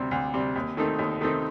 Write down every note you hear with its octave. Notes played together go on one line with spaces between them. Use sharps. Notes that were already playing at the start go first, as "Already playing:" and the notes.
Already playing: D2 C3 G3 C4
D2
C3 G3 C4
D#2
D#3 A3 C4 D#4
D#2
D#3 A3 C4 D#4